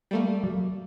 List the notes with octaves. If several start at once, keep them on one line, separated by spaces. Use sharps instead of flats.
G3 A3 A#3
F#3